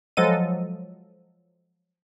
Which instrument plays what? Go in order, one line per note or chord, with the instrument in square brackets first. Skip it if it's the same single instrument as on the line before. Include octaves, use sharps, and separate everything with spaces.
[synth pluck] F3 F#3 G#3 A4 D#5 D#7